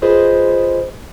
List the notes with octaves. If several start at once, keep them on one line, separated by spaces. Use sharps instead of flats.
F4 G#4 B4 C5 D#5